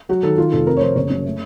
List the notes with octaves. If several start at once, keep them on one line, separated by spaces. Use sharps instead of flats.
F#3 F#4
D#3 A4
D#3 F4
F1 A4
F2 A#4
C#5
F3 C5
F#1 C#5
F#2
A3